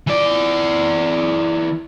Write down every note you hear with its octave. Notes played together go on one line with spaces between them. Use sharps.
E3 D5